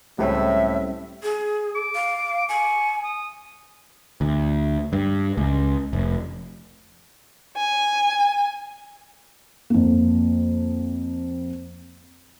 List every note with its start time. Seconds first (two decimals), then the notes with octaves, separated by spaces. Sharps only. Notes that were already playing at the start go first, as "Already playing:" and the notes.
0.19 C#2 A2 G3 C4 C#4 E5
1.23 G#4
1.75 D6
1.95 F5
2.49 G#5 C#6
3.04 D#6
4.21 D2
4.93 G2
5.37 C#2
5.93 F1
7.56 G#5
9.70 F2 A#3